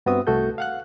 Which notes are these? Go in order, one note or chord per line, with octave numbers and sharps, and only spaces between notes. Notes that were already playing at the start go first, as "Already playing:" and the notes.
G2 B3 C4 F#4 E5 D#6
C2 A3 F#4 A4 G6
F5 F#5 F#6